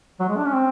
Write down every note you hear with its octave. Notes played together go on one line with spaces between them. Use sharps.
F#3
G#3
D4
C#4
C4